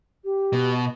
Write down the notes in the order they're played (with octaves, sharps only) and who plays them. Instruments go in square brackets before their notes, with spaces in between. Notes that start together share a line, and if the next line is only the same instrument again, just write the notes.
[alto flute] G4
[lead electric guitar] B2